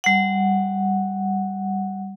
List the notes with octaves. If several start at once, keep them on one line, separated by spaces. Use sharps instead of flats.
G3 F#5